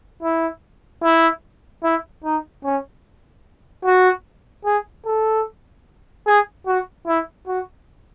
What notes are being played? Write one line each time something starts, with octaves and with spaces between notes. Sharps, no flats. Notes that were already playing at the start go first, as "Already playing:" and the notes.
E4
E4
E4
D#4
C#4
F#4
G#4
A4
G#4
F#4
E4
F#4